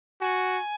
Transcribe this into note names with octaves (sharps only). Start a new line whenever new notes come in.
F#4 G#5